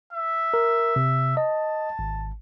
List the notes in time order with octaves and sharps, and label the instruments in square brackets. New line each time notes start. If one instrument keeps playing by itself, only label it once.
[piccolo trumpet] E5
[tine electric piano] A#4
C3
[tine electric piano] D#5 [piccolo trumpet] A5
[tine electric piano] G#1